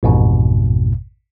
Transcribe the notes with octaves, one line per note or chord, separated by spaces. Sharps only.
A1 F2 G#2 B2